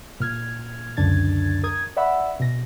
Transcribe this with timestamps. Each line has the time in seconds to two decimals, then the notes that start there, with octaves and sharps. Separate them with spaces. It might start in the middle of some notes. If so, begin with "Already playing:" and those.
0.20 A#2 F6 G#6
0.97 C#2 F#2 D3 D4 G#6 A6
1.63 A#4 D#6 G#6
1.97 D5 E5 F#5 B5 E6
2.40 B2 A#6